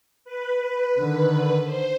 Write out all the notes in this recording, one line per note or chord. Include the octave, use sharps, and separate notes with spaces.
B4
D3 D#3
C5